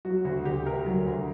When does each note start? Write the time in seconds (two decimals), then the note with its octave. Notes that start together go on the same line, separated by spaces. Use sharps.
0.05 F#3 F#4
0.25 D2 F#4
0.45 D2 G4
0.66 D2 A#4
0.86 F#3
1.06 D2